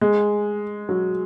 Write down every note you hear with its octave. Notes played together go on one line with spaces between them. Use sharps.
G#3
F#3